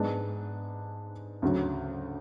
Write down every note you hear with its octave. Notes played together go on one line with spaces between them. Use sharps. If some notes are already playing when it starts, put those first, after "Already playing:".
Already playing: G#2 G#3 B3 D4
D2 C#3 F#3